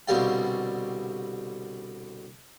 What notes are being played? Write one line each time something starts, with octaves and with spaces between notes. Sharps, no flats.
C2 B2 D3 G3 F5 G5